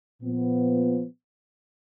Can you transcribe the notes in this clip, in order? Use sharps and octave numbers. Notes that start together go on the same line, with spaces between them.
A#2 F3 B3